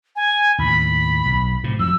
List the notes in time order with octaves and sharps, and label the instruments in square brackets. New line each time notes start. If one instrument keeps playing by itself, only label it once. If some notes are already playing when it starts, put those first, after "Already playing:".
[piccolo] G#5
[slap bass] D#2 A2 [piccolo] B5
[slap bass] B1
A2 C3
[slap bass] F2 F#3 [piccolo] E6